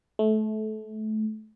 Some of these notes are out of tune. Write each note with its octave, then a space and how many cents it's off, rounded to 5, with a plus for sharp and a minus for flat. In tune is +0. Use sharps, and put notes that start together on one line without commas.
A3 -25